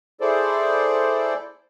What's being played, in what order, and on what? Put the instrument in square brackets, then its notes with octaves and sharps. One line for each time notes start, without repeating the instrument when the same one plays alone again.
[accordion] E4 G#4 A4 C5 D5